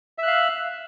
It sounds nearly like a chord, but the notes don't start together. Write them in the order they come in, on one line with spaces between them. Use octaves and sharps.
E5 F#6 F5